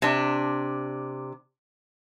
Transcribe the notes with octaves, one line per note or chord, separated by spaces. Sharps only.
C3 D4